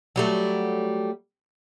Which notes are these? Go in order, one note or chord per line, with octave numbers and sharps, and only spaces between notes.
F#3 G3 A3